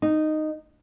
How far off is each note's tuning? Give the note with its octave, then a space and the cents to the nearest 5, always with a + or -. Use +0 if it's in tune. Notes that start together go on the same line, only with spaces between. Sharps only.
D#4 -10